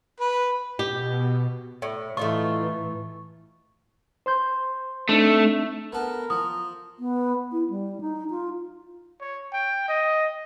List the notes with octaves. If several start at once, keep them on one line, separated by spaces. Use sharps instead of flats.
B4
B2 G4
A2
A2 E3 A3 D#4 F4 C#6
C5 C6 G6
A3 C4 D4 D#4
B3 A4 A#4
F3 D#6
B3
E4
G3
D#4
F4
C#5
G5
D#5